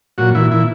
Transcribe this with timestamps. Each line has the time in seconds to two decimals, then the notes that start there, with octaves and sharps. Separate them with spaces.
0.18 A#2 F#3 F#4
0.35 A#2 E3 E4
0.51 A#2 E3 E4